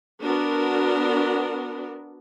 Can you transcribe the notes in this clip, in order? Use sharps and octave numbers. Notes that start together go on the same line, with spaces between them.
B3 D4 F#4 A#4